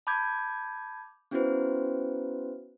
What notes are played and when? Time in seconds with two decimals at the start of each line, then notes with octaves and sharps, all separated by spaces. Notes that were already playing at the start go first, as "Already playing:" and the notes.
0.07 A5 B5 D6 G6 G#6
1.31 B3 C#4 E4 F#4 B4 C5